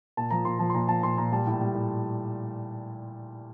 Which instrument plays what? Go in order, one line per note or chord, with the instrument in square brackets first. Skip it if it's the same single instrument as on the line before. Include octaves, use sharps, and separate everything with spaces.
[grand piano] A#2 A5
F3 A#5
A#2 C6
F3 A5
C6
A#2 A#5
F3 A5
A#2 C6
A#2 A#5
G3 A5
A2
G3
A2